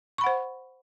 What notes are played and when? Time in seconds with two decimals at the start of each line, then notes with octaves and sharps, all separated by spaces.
0.18 C#6
0.21 B5
0.24 F#5
0.27 C5